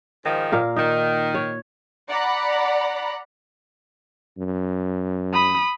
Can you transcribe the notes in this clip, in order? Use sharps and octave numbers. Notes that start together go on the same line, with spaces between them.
G#2 D#3 F3
A#2 A#4 F5
D#3 D#4
C#5
D5 F#5 A#5 B5
F#2
B5 D#6